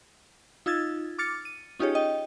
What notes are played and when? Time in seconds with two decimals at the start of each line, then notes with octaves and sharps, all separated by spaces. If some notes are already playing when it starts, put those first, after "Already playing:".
0.66 D#4 F4 E6 G#6 A6
1.18 D6 F6 A6 C#7
1.45 D#7
1.79 C#4 D#4 F4 G4 G#4 C#5
1.95 D#5 G5